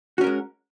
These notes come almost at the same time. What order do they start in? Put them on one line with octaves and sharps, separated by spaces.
F#4 C#4 A#4 G#3